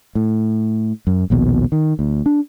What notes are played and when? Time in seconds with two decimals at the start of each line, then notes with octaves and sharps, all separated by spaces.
0.15 A2
1.07 F#2
1.30 A#1 D#2 B2
1.72 D#3
1.99 D2
2.26 D4